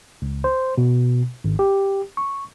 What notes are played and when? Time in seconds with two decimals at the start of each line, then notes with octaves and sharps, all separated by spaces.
0.22 C#2
0.44 C5
0.78 B2
1.44 G#1
1.59 G4
2.17 C#6